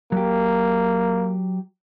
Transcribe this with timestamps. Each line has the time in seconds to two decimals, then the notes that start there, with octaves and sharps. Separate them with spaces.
0.12 F#3 A#3 G4